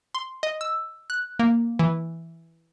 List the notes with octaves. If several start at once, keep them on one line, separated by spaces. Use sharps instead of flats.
C6
D#5
E6
F#6
A#3
E3